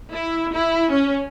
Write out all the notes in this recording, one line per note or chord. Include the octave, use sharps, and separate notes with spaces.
E4
E4
C#4